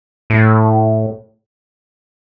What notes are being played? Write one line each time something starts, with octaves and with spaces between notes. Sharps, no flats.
A2